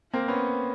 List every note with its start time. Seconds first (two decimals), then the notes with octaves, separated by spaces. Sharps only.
0.13 A#3 C4
0.28 B3 C#4